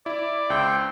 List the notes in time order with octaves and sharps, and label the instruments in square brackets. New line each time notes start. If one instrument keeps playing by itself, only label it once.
[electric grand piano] E4 [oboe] D5
[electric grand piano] C#2 [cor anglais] C4 [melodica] G5